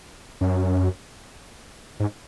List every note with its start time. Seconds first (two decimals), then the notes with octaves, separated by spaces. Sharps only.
0.41 F#2
2.00 G#2